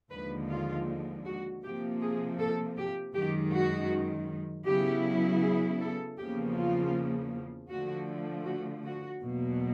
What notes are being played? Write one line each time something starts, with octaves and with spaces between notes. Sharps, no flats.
D#2 D3 F3 G#3 B4
F4
F#4
C3 F3 A#3 G4
G#4
A4
G4
F#2 D#3 G#3 G4
F#4
C#3 F#3 B3 E4 G4
G#4
A4
E2 C#3 F3 A#3 G4
F4
D3 F3 A3 F#4
F#4
F#4
E2 B2 F#3 A#3